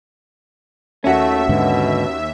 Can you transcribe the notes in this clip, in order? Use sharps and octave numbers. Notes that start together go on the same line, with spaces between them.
D#2 A3 C#4 F#4 E5
G#2 B2 D3